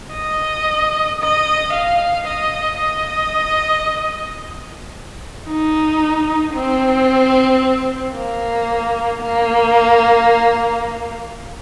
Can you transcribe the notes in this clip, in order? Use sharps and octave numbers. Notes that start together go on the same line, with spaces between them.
D#5
D#5
F5
D#5
D#5
D#4
C4
A#3
A#3